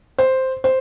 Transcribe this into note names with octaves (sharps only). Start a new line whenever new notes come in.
C5
C5